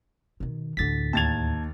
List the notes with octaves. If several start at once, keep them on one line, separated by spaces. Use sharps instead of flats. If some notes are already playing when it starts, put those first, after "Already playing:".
B2 D#3
A1 D2 D3 A6 B6
D#2 A5 G#6 A6 F7